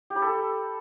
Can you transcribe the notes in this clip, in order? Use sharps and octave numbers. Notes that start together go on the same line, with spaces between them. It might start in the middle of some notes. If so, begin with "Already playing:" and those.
G4
B5
A4